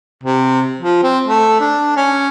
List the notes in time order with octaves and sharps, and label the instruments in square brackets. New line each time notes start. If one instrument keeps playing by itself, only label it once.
[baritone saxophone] C3
F3
C4
A3
D4
C#4